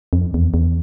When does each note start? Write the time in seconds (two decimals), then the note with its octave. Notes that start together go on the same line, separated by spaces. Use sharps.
0.13 F2
0.34 E2
0.54 E2